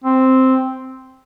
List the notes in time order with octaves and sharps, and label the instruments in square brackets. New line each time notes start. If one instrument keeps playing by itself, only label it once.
[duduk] C4